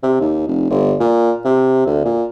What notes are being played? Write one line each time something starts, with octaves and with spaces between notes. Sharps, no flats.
C3
D#2
F1
G1
A#2
C3
D2
A#2